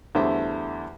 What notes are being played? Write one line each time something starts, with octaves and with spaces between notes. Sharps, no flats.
E2 D3 G3 A3 C5 E5